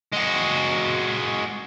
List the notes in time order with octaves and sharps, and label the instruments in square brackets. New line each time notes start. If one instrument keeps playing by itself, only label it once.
[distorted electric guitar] G#3 F#4